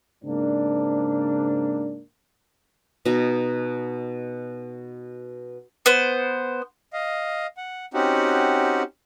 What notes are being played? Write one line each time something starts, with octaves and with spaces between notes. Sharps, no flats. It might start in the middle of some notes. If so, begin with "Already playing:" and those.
G#2 C#3 A#3 C4 D4
B2 D#4
B3 C5
D#5 F5
F#5
C4 C#4 D#4 F#4 G4 F#5